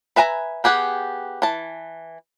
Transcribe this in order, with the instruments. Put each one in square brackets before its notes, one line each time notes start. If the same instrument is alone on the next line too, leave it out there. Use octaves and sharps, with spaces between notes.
[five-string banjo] B4 E5 G#5 A#5
B3 G4 G#4 F#5
E3 A5